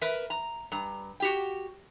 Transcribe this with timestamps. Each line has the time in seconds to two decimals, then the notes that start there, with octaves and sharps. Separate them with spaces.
0.01 A#4 B4 E5
0.30 A#5
0.72 G2 A#5
1.20 F#4 G4 G5